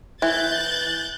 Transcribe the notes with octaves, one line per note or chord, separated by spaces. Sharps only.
E3 F#6 G6 A6